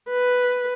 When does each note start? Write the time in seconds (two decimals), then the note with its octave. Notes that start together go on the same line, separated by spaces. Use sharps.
0.09 B4